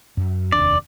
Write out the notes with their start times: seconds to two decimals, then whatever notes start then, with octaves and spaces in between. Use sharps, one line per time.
0.17 F#2
0.52 F1 D#2 D4 D5